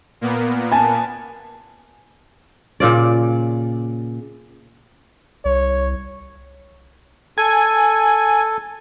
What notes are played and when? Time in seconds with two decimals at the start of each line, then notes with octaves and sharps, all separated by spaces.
0.21 A#2 A#3 B3
0.72 G#5 A5
2.80 A#2 C#3 D5
5.45 C2 C#5
7.38 A4 G#5